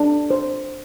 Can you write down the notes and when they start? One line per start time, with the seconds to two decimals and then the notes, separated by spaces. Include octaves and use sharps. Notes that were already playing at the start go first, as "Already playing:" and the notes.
Already playing: D4
0.30 C5